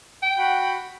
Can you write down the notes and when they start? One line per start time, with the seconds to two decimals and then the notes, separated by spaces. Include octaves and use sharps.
0.23 G5
0.38 F#4 F#5 B5